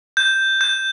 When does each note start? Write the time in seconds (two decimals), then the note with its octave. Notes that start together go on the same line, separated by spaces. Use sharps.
0.17 G6
0.61 G6